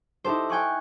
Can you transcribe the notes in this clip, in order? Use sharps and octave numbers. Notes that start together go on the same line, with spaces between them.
D#4 E4 G4 A4 C5
G5 G#5 C#6 F#6